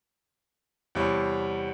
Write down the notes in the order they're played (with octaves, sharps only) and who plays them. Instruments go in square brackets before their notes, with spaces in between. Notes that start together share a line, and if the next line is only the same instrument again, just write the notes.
[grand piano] E2 C3 G3 C#5